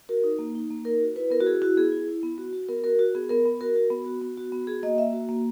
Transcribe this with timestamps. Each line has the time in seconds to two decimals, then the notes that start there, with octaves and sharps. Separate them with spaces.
0.09 F#4 A#4
0.24 D#4
0.39 A#3
0.55 D#4
0.70 A#3
0.85 D#4 A#4
1.01 F#4
1.16 E4 B4
1.30 B3 A#4
1.41 F#4
1.46 E4 G#4
1.62 E4 F#4
1.77 B3 G#4
1.92 E4
2.08 E4
2.23 B3
2.38 F#4
2.53 F#4
2.69 B3 A#4
2.84 F#4 A#4
2.99 F#4
3.15 B3 G#4
3.29 B3 A#4
3.46 B3
3.61 F#4 A#4
3.76 F#4
3.91 B3
4.06 F#4
4.22 B3
4.37 F#4
4.52 B3
4.67 F#4 G#4
4.83 A#3 D#5
4.98 A#3 E5
5.13 F#4
5.29 A#3